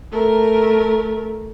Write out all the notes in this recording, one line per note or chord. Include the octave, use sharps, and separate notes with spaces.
A3 A#4